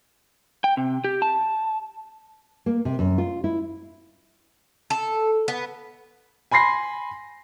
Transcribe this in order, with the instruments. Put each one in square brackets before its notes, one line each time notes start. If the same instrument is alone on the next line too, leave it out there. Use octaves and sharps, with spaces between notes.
[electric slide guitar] G5
C3
G4
A5
[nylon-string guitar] A#3
C3
F#2
F4
E4
[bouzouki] A4
B3
[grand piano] G#5 B5 C6 A#6 C7